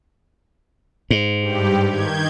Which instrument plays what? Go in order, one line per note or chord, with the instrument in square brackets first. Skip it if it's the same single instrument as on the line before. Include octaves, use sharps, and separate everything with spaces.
[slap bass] G#2
[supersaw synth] G2 G4
D#3 G6 G#6